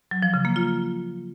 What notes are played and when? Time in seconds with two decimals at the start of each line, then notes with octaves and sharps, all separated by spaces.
0.11 F#3
0.23 F3
0.34 C#3
0.45 A#3
0.56 F4